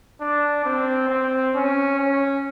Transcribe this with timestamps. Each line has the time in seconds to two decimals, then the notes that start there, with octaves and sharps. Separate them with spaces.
0.21 D4
0.65 C4
1.09 C4
1.55 C#4
1.99 C#4